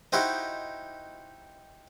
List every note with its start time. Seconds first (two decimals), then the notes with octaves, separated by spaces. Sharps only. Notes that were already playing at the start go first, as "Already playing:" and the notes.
0.12 D#4 E4 F#4 G4 C5 D#5